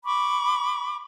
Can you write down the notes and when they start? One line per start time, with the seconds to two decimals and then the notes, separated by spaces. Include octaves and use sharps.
0.04 B5 C#6 D6